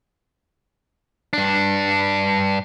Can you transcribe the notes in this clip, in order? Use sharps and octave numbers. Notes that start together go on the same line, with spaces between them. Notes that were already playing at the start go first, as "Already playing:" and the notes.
G2 D4